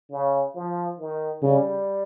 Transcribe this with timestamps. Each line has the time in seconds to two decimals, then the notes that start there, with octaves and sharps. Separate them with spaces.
0.11 C#3
0.55 F3
0.99 D#3
1.42 C#3 G3